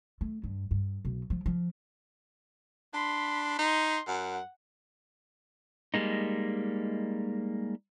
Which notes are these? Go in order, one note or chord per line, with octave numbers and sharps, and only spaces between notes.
A3
G2
G2
B1
F3
F3
D4 B5 C6
D#4 C6
F#2 F#5
G3 G#3 A#3 D#4